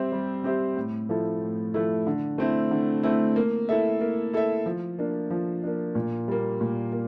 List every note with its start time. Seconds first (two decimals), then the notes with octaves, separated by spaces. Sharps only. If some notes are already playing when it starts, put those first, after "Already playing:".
Already playing: G3 C4 G4 C5 E5
0.12 G3
0.44 C4 G4 C5 E5
0.76 A2
1.09 F3 A3 E4 A4
1.42 A2
1.74 F3 A3 E4 A4
2.07 D3
2.38 A3 C4 E4
2.71 D3
3.03 A3 C4 E4
3.36 A#3
3.69 E4 A4 E5
4.01 A#3
4.33 E4 A4 E5
4.66 F3
4.99 A#3 D4
5.30 F3
5.64 A#3 D4
5.95 A#2
6.28 G3 A#3
6.61 A#2
6.92 A#3